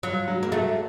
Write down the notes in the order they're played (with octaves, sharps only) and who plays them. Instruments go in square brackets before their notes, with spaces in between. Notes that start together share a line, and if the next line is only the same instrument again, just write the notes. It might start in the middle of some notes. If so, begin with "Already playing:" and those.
[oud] F#3 [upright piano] F4
[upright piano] F#3
[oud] A#3
[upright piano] F#3 [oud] A3